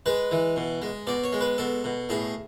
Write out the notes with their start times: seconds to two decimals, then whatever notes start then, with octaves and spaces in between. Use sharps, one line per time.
0.06 G#3 B4
0.31 E3
0.56 B2
0.82 G#3
1.07 B2 D5
1.24 C#5
1.33 G#3
1.41 B4
1.58 B2 A4
1.84 B2
2.09 A2 G#4